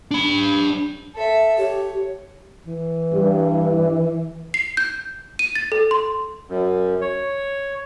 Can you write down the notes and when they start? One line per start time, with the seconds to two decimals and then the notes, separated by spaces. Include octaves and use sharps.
0.11 D4 B5
1.15 A4 E5
1.58 G4 C#5
2.67 E3
3.12 G2
4.54 C7
4.77 G6
5.39 D#7
5.55 A6
5.72 A4
5.91 C6
6.49 F#2
7.01 C#5